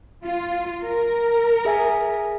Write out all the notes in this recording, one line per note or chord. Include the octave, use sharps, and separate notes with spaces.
F4
A#4
G#4 E5 G#5